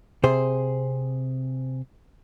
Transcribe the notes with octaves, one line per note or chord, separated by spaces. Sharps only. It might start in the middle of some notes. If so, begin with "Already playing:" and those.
C3 G#4 C5